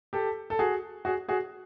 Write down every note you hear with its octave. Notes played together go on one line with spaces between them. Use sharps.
G4 A4
A4
F#4 G#4
F#4 G#4
F#4 G#4